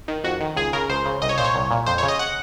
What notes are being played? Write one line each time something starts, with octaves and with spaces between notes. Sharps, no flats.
D#3
F2 F#4
D#3
C#2 G#4
C#3 A#4
C#2 C5
C#3
C2 D#5
C#5
A#2 C5
C#5
C2
A#2
F2 C5
C#5
C#3
D#5
F#5